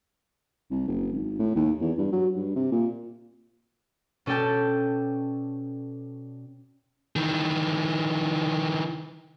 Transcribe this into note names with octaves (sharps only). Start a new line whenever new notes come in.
C2
F#1
G#1
A2
D#2
E2
G2
F#3
G2
C3
A#2
B2 C#4 A4 D5 G5 A5
D#3 E3